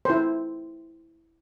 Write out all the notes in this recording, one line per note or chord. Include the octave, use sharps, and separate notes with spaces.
E4 C5